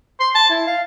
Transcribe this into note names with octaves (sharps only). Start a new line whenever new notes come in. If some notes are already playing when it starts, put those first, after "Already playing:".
C6
A5
E4
F5